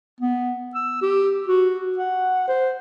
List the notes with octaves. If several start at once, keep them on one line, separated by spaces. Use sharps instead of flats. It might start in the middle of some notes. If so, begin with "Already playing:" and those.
B3
E6
G4
F#4
F#5
C5